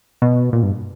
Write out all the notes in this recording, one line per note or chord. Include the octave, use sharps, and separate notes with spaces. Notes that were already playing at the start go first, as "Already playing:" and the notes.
B2
A#2
G2